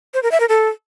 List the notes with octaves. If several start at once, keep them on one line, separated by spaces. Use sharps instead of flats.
C5
A#4
E5
A#4
A4